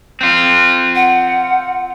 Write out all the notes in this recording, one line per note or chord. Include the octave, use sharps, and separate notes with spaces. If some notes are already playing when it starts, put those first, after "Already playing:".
C4 F4
F#5